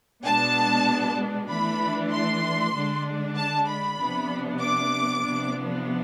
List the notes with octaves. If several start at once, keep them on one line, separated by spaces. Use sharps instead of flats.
B2 G#3 B3 D4 A5
E3 A3 D4 B5
C6
D3 G#3 D4
A5
B5
C3 F3 B3 D4
D6
C3 F3 B3 D4